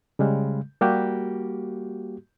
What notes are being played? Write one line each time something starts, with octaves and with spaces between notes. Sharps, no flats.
C#3 G3 G#3
G3 A#3 F#4 G4